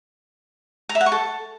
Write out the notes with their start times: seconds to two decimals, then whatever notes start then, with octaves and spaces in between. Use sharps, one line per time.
0.89 A#5
0.95 E5
1.01 F#5
1.06 C#6
1.12 A4